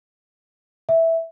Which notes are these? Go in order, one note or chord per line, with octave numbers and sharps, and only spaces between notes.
E5